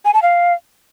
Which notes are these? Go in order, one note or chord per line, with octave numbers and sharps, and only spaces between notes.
G#5
A5
F5